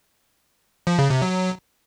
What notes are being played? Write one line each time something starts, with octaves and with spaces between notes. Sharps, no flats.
F3
C#3
C3
F#3